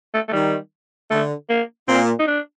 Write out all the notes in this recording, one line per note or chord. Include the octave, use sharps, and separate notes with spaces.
A3
A3
D#3 G3
D3 A3
A#3
A#2 C4
D#4
D4